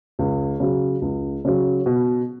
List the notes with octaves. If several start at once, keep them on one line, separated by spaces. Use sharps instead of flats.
C#2
C#3 F#3
C#2
C#3 F#3
B2